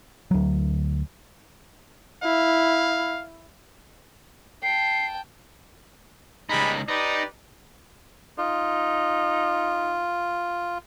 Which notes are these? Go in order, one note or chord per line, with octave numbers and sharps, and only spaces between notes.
D2 F#3
E4 F5
G5 A5 C7
C#2 G3 G#3 D#4 B5
D#4 G4 B4 D5
D#4 F4